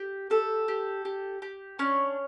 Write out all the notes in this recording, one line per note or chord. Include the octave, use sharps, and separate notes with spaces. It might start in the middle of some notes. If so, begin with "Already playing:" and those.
Already playing: G4
G4 A4
G4
G4
G4
C#4 D4 C#5